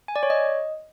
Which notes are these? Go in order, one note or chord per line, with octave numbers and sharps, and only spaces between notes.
G#5
D5
C#5
D#5